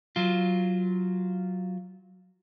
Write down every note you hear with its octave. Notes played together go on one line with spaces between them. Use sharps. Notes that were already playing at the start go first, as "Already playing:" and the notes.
F#3 F4